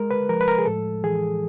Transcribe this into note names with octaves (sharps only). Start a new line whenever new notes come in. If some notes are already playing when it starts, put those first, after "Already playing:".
Already playing: G#3 A#4
B4
F3 A#4
B4
A#4
G#4
A2 A4
E3 G#4